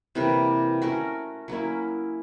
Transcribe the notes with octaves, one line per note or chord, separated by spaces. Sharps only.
C3 E3 G3 A#3
A3 C#4 F#4 A#4
F#3 A#3 C#4 E4